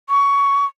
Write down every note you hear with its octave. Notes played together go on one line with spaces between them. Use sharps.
C#6